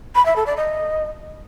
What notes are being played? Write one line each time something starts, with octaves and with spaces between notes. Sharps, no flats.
B5
E5
A4
D5
D#5